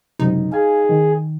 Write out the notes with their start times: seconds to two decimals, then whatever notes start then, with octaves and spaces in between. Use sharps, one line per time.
0.19 C#2 F#2 C3 D#4
0.52 G#4 F5 G#5
0.89 D#3